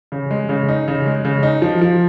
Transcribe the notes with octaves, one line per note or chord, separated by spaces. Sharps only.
C#3
G#3
C#3
D#4
C#3
G#3
C#3
D#4
F3
F3